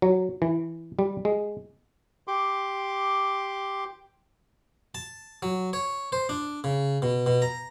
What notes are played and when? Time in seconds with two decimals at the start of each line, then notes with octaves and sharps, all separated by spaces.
0.02 F#3
0.42 E3
0.99 G3
1.25 G#3
2.28 G4 C6 D6
4.95 A5
5.43 F#3
5.73 C#5
6.12 C5
6.29 D4
6.64 C#3
7.02 B2
7.26 B2
7.42 A#5